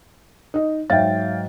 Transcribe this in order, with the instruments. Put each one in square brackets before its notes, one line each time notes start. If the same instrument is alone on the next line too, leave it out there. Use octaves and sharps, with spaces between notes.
[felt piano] D#4 D#5
[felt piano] G#2 F#3 A6 [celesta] C#5 E5 [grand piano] F5 G5